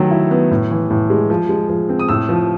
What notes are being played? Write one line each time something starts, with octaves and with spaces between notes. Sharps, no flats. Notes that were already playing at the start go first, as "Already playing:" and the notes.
Already playing: D#3 F#3 A3
E4
B3
A2
E3
A2
G#3
F3
G#3
F3
C4
D#6
A2 E6
F3